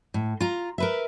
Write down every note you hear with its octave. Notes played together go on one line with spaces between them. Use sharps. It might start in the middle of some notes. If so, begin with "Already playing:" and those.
A2
F4 A#5
A#4 B4 E5